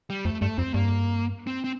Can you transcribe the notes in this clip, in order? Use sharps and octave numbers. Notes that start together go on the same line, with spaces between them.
G3
F2 A3
G2 A3
F2 C4
G2 A#3
C4
C4